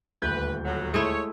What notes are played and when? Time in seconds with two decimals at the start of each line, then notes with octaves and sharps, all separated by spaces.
0.22 D#1 D2 B4 G6
0.65 A2 F#3
0.94 G#3 A3 E4 C#5